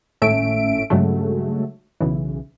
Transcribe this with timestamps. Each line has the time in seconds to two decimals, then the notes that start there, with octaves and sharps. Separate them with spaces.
0.22 G#1 A2 A3 C#4 E5 D7
0.90 G2 C#3 F#3 G#3 A3
2.01 B1 C#3 E3